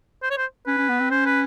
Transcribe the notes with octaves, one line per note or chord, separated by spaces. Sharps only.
C5
C#5
C5
C#4 B4
C#4
B3
C4
C#4 C5
B4